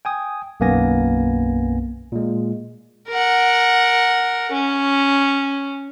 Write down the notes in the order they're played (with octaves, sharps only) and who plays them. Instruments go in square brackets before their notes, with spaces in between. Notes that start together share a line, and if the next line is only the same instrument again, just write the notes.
[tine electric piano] G5 G#5 D#6
B1 F#2 A#3 B3 G#5 A#6
A#2 G#3
[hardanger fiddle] A#4 F#5
C#4